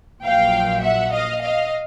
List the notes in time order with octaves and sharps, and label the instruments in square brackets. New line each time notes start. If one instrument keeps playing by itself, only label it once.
[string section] A#1 A#2 F#3 F5 G5
E5 F#5
D#5 F5
D#5 F5